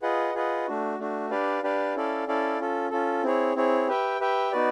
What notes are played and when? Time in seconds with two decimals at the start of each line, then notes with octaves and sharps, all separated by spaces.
0.02 F4 G#4 B4 D#5 F#5
0.34 F4 G#4 B4 D#5 F#5
0.67 A3 D4 F#4
0.99 A3 D4 F#4
1.30 D4 G4 B4 D5 F5
1.62 D4 G4 B4 D5 F5
1.95 C#4 E4 A4 D5 F5
2.27 C#4 E4 A4 D5 F5
2.59 C#4 F4 A4
2.91 C#4 F4 A4
3.23 C4 E4 G#4 C#5
3.56 C4 E4 G#4 C#5
3.88 G4 B4 E5 G5
4.20 G4 B4 E5 G5
4.52 B3 D#4 F#4 B4 D5